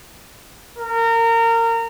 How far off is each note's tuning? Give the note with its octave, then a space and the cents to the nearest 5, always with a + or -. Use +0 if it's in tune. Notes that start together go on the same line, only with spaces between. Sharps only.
A#4 -25